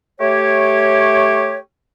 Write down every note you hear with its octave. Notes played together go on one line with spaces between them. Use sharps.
A3 G4 C#5